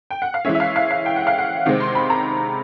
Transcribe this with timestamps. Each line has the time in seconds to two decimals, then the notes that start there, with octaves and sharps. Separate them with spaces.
0.10 G5
0.22 F#5
0.34 F5
0.45 E3 G#3 C#4 E5
0.55 E5
0.60 F5
0.76 F5
0.91 F5
1.06 G5
1.16 F#5
1.27 F5
1.38 F#5
1.66 C3 D#3 G#3 C4
1.80 C6
1.95 B5
2.10 A#5